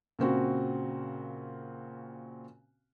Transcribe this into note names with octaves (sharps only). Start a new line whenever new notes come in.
A#2 C#3 C4 F#4